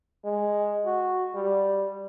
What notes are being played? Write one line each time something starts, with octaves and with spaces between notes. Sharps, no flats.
G#3
F#4
G3